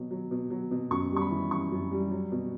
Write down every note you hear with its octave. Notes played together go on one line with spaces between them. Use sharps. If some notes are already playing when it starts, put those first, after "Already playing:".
Already playing: B2 F#3
F#3
B2
F#3
B2
F#2 C#6
G3 C#6
B5
E3
F#2 C#6
F#2
G3
F#3
B2